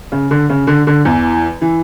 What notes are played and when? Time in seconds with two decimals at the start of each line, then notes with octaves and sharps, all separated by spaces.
0.12 C#3
0.31 D3
0.49 C#3
0.67 D3
0.87 D3
1.05 E2 E3
1.61 E3